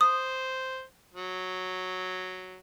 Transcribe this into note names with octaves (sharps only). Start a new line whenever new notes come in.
C5 D#6
F#3